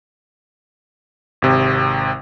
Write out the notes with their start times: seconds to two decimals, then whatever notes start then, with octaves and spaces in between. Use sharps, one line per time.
1.42 G#1 C3